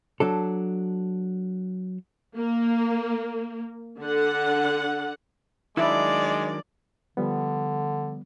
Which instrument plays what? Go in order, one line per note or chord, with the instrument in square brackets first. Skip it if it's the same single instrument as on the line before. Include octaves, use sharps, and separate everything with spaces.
[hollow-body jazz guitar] F#3 D4 A4
[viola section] A#3
D3 F#5
[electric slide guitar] D#3 F#3 D4 [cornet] G#3 [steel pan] E4 [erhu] D5
[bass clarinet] D3 [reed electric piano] F3 G3 B3